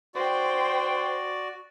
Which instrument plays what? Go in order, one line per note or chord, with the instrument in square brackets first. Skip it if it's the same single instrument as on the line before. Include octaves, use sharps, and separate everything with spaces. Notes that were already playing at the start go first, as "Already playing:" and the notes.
[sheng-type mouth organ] F#4 D5 [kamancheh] C5 G5